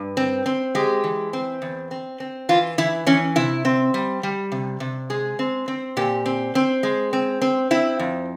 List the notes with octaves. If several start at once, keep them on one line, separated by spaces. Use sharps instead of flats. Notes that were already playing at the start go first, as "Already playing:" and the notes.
Already playing: G2
C4
C4
G#3 G4
E3
C4
E2
C4
C4
E3 F4
E3 E4
E3 C#4
C3 E4
C4
G3
G3
C3
C3
G#3 G#4
C4
C4
A#2 G4
C4
C4
G#3
C4
C4
C4 E4
F2